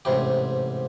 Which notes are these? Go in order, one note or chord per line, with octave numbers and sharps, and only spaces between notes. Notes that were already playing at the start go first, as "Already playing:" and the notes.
A1 G#2 C3 G4